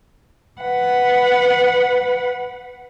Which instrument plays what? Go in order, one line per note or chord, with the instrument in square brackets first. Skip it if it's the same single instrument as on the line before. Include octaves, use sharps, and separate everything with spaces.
[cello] B4 F#5